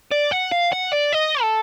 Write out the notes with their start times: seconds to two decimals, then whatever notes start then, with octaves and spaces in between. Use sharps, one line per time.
0.12 D5
0.32 F#5
0.52 F5
0.72 F#5
0.92 D5
1.12 D#5
1.42 A4